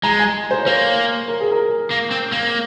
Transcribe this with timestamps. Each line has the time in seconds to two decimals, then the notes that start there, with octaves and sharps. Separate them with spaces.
0.03 G#3 A#5
0.19 G#5
0.51 C5
0.59 C#5
0.66 A#3 C5
1.28 A#4
1.40 G#4
1.51 A#4
1.91 A#3
2.11 C4
2.32 A#3